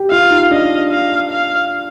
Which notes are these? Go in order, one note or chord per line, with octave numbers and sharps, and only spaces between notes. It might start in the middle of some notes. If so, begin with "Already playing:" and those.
Already playing: G4
F4 F5
D#4
D4 D#5
F5
F5